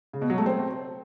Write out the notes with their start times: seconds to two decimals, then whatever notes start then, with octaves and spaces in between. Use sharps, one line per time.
0.13 C#3
0.22 B2
0.30 F#3
0.38 A3
0.46 C4